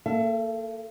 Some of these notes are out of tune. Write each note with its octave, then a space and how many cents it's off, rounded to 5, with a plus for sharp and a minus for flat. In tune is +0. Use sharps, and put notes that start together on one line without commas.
A#3 -25 A4 +0 E5 +45